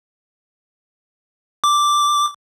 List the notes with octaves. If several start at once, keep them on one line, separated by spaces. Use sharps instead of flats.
D6